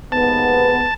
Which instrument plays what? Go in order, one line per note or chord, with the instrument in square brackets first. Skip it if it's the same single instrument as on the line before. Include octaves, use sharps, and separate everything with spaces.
[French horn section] D#2 G#2 B3 [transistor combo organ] A5